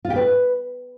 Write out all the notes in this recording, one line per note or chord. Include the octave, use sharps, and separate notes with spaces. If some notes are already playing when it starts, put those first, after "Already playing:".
F4
G4
B4